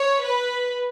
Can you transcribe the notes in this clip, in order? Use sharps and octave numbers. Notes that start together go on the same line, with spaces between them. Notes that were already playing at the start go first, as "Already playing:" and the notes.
Already playing: C#5
B4